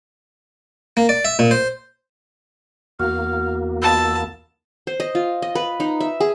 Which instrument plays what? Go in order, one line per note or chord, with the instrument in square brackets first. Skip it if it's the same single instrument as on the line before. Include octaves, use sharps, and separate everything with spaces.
[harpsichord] A#3
D5
E5
A#2
C5
[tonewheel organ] E2 A#3 [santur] F#4 [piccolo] F6
[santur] B3 F4 D#5 [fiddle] A5 [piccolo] E6
[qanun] C5
D#5
F4
D#5
B4
D#4
E5
G#4